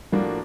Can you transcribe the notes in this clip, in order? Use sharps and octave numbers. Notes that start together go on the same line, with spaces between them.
A2 F3 G3 A#3 D4 F#4